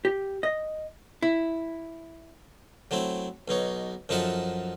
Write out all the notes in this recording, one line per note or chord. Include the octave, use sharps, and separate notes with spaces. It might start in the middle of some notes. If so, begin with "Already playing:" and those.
G4
D#5
E4
F#3 A3 C4 E4
B1 B2 D#4 C#5
F#2 F3 D#4 A4 E5 F#5